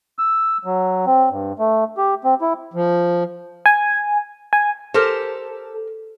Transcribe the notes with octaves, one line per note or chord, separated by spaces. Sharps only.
E6
F#3
C4
G2
A3
G4
C4
E4
F3
G#5
G#5
G4 A4 A#4 C5